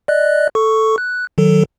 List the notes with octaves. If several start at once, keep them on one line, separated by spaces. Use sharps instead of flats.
D5 D#5 F#6
A4 C#6
F#6
D#3 F#3 A4